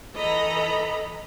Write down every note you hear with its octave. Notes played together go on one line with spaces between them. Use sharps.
E3 A4 D#5 A#5 B5